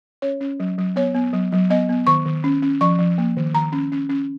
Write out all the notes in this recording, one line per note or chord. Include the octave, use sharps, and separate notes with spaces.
C#4 C#5
C#4
F#3
F#3
B3 C#5
B3
F#3
F#3
B3 D#5
B3
D#3 C#6
D#3
C#4
C#4
F3 C#6
F3
A#3
D#3
D#3 A#5
C#4
C#4
C#4